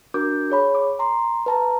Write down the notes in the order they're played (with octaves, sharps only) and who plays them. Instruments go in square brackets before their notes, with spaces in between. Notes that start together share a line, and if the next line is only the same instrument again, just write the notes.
[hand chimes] D4 F#4 A#4 D6 G6
G#4 C#5 B5
D6
A#5 C6
B4 A5 A#5